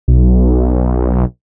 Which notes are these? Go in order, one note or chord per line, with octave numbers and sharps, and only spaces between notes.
B1